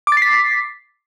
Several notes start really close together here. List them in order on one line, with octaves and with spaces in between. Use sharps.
D6 A6 C7 B6